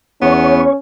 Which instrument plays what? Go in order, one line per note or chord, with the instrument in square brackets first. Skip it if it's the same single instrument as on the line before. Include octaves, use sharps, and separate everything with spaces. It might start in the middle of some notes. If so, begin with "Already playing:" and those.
[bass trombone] E2 [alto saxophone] B3 [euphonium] C#4 [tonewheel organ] C#5